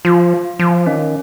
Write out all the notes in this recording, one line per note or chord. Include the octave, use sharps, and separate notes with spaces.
F3 F4
F3
D#3 C#4